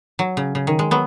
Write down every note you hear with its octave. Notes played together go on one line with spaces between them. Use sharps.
F#3
C#3
C#3
D#3
G#3
F#3 B3